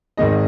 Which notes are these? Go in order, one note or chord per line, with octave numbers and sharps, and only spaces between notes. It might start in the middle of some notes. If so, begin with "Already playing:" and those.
G#1 G#2 D#3 G#3 D#5